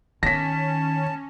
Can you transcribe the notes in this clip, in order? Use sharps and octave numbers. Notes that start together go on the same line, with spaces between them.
D#3 C#4 A5 A#6 B6